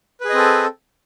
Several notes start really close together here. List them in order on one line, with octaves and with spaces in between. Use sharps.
B4 G#4 D#5 C4 A4